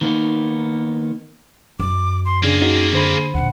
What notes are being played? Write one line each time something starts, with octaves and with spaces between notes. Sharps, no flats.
D#3 A#3 B3 D#4
F#2 D6
C6
C#3 A#3 C4 D4 G#4 G#6
C#4 D#4 F#4
D3 C5 B5
A#1 D#2 F#5